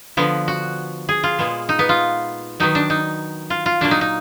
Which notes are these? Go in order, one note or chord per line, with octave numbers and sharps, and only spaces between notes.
D3 F3 B3
F#4
G#4
F4
A#2 G#3 B3
D#4
B3
F4
D#3 F#3 B3 D#4
D4
D#4
F4
F4
A#2 F#3 A#3 D4
D#4
D#4